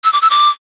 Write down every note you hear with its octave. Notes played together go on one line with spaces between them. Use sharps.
E6
D6
E6
D6